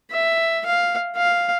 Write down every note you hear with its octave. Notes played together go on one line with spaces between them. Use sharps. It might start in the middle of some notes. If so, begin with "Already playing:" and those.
E5
F5
F5